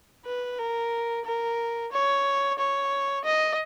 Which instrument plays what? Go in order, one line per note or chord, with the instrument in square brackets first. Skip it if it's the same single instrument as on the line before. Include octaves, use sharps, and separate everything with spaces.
[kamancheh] B4
A#4
A#4
C#5
C#5
D#5